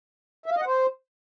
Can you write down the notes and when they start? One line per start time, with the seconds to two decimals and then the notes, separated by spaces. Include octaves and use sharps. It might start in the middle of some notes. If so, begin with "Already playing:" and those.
0.46 E5
0.51 F5
0.56 D#5
0.61 F#5
0.67 C5